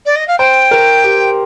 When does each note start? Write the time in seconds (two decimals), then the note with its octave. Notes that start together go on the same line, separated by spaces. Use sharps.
0.06 D5
0.16 D#5
0.28 F5
0.38 C5 G5
0.71 A#4
1.04 G4